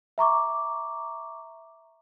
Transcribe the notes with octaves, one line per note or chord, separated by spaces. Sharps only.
E5 A#5 C#6 D6